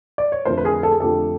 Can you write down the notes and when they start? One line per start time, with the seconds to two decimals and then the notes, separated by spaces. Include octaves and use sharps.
0.18 D5
0.32 C#5
0.45 F2 D3 F3 A3 A#4 C5
0.58 B4
0.64 G#4 A#4
0.83 A4
0.92 G#4
1.00 F2 D3 F3 A3 G4 A4